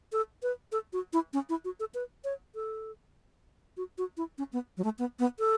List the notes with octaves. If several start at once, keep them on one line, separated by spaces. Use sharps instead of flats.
A4
B4
A4
F#4
E4
C#4
E4
F#4
A4
B4
C#5
A4
F#4
F#4
E4
C#4
B3
F#3
A3
B3
B3
A4